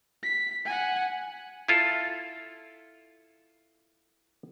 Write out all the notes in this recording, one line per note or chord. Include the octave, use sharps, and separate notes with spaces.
B6
F#5 G#5
E4 F4 A4